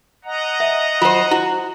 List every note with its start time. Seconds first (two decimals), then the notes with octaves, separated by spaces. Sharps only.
0.25 D#5 F#5 A#5
0.60 E5
1.02 F#3 F4 C5
1.31 E4 F#4